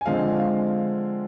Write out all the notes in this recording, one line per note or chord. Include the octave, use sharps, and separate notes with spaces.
G#5
D3 F3 G#3 C4 F5
F5